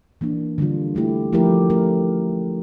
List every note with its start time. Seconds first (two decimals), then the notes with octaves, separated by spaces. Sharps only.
0.21 E3 A#3 D4
0.58 D3 G3 D4 F4
0.95 D3 A3 E4 G4
1.33 F3 A3 E4 G4 A#4
1.70 A3 C#4 G4 A#4